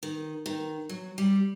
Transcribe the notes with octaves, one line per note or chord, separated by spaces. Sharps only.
D#3
D#3
F#3
G3